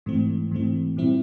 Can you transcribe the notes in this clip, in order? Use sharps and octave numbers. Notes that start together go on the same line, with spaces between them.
G#2 E3 A3 C4
G#2 E3 A3 C4
A#2 G3 C4 E4